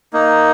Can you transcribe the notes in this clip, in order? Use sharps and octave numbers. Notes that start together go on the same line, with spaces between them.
A#3 D#4